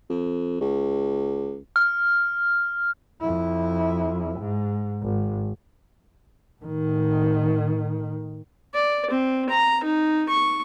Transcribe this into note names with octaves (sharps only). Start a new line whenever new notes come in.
F2
C#2
F6
F2 E4
G#2
G#1
A2 D#3
D5
C4
A#5
D#4
C#6